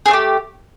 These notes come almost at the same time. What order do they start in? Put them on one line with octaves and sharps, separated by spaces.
G#4 C4 A3 G4